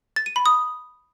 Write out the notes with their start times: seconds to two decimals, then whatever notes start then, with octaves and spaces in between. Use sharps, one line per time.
0.16 A6
0.26 D#7
0.36 B5
0.46 D#6